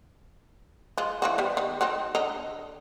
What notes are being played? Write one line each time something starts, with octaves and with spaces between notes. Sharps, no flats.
G#3 F4
E3 F3 F#4
G3 B3
D#3
F#3 C4 D#4
D3 D#5 A#5